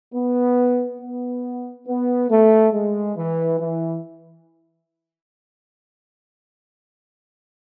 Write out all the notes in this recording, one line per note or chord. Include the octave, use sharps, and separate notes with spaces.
B3
B3
B3
A3
G#3
E3
E3